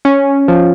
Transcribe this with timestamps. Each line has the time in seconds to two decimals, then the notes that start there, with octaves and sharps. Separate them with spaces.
0.05 C#4
0.48 F3